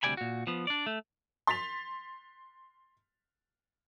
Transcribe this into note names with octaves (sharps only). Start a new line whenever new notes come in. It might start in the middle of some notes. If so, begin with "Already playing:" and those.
D2 C3 G3 D5 G#5 B5
A#2 F#4
F3 B3
D4 D5
A3
C6 A6 B6 F7